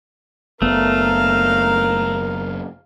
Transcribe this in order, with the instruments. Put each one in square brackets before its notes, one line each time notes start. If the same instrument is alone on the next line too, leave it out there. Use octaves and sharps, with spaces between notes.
[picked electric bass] F#1 B3 [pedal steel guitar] A3 [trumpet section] A#4 [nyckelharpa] F5